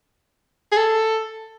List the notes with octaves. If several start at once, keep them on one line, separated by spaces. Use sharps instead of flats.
G#4
A4